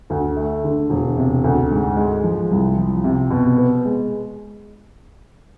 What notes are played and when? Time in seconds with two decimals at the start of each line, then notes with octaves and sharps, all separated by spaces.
0.10 D2
0.37 A3
0.64 D3
0.90 E1
1.17 C3
1.44 D2
1.71 G#2
1.97 G#3
2.24 F3
2.51 C2
2.77 F3
3.04 C3
3.30 B2
3.58 B3
3.85 G#3